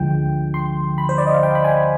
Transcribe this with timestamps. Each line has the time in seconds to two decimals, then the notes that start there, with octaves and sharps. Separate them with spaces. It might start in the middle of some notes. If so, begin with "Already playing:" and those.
Already playing: D2 D3 F3 G#3 G5
0.54 C6
0.98 B5
1.09 C5
1.18 D5
1.26 D#5
1.34 F5
1.43 G5
1.55 B5
1.64 G#5